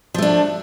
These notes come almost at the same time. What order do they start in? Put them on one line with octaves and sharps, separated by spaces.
F3 A3 D4